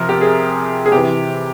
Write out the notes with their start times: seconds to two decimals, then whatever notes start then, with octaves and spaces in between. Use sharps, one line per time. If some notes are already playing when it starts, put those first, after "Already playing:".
Already playing: C3 F3 A#4
0.09 G4
0.21 G#4
0.86 G#4
0.92 C3 E3 G4